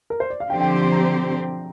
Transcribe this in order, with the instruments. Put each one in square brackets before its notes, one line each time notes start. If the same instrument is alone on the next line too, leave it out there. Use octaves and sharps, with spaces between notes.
[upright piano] A#4
C5
D5
F5
[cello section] D3 F3 C4 G4 C5 [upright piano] G5
[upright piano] G5
C6
C6
A#5